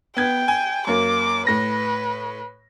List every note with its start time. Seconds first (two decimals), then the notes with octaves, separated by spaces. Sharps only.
0.17 B3 G5 G#6
0.48 G#5
0.87 F#2 A#3 D6
1.47 A2 B4 A#6